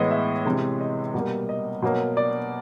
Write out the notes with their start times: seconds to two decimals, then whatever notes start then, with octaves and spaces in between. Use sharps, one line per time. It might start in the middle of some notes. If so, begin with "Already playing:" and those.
Already playing: A2 E3 G#3 B3 D#5
0.11 E5
0.46 C3 E3 G#3
0.81 D#5
1.14 B2 G3 A#3
1.49 D#5
1.82 B2 F#3 A#3
2.17 D5